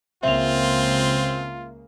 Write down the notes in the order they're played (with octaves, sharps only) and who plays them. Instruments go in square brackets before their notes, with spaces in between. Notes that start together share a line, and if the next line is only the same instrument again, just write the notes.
[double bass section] C#2 C#3 A#3 [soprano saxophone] C4 [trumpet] F4 [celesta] E5 F7